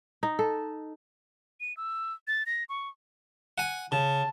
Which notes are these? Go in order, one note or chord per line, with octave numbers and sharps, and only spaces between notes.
D#4
A4
D#7
E6
A6
A#6
C#6
F#5 G#5
C#3 A5